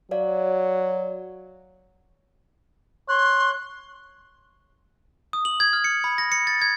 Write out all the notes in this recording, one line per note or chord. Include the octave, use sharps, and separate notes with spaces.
F#3 C#5 D5 F5
C#5 C6 F#6
D#6
F#7
G#6
F6
C#7
B5
A#6
C#7
A6
G#6